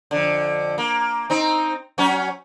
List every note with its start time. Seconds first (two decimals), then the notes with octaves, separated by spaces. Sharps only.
0.11 F2 D3
0.78 A#3
1.30 C4 D#4
1.98 F#3 C#4 C#5